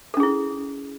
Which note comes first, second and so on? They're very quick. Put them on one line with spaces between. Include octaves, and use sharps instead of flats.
A4 C#4 G#4 E4